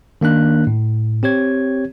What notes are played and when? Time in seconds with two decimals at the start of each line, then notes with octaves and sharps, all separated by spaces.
0.21 D#3 A#3 D4 F#6
0.67 A2
1.23 C4 G4 C#5 G#6